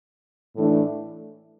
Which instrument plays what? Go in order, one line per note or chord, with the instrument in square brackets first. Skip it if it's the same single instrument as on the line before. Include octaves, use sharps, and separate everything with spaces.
[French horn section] A2 E3 A3 D4